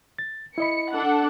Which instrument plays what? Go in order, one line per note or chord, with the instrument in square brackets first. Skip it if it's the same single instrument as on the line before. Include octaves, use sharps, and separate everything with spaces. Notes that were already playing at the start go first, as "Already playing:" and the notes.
[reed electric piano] A6
[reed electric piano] E4 D#5 B5 [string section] C#7
[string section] D4 A4 F#5